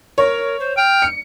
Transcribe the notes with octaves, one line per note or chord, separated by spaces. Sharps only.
A#4 C#5
C5
G5 F6
C#7